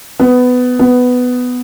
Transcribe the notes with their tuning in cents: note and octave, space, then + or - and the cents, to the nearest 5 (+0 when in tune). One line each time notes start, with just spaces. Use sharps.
B3 +15
B3 +10